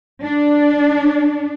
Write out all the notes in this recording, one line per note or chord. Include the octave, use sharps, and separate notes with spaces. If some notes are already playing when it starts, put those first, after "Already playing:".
D4